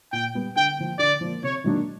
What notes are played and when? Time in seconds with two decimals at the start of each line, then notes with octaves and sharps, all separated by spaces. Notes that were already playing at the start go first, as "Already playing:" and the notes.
0.13 A#2 G5
0.35 G3 B3
0.56 D3 G5
0.78 F3 A#3
0.99 D3 D5
1.21 F3 A#3
1.43 C3 C#5
1.64 D#3 F#3 A#3 D4